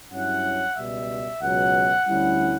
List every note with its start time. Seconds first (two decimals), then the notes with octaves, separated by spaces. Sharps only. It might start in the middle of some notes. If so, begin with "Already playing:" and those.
0.12 G2 F#3 C#4 E4 F#5
0.76 C#2 B2 G3 E5
1.42 C#2 B2 F#3 F#5
2.07 D2 D3 G3 C#4 E4